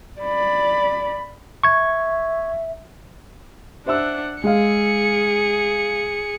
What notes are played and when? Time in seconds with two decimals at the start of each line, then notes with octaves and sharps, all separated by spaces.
0.21 D5 B5
1.64 E5 C#6 G#6
3.86 D4 C5 E5 F#5 E6
4.44 G#3 G#4 F5 C#7